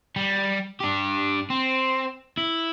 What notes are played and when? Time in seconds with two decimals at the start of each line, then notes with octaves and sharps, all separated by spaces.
0.16 G3
0.80 D4 G4
1.50 C4
2.37 E4